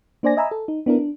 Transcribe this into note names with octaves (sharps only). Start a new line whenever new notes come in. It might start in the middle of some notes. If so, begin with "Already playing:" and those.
A#3 D4 C5 D5 G#5 A#6
D#5 E5 G#5 A#5 B5 E6
A4
D#4
B3 D4 E4 A#4
D4